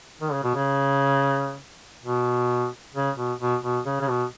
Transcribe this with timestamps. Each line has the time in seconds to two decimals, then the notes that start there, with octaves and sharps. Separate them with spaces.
0.21 D#3
0.32 C#3
0.43 B2
0.55 C#3
2.03 B2
2.95 C#3
3.17 B2
3.40 B2
3.63 B2
3.85 C#3
4.01 C#3
4.08 B2